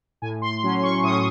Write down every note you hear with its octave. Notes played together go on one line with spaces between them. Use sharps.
A2 G#5
C6
F#3 C#4 C6
C6
C#6
A2 D#6